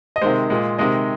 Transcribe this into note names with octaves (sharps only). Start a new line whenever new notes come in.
D#5
C3 D#3 G#3 C5
A#2 G#3
C3 D#3 G#3 D#5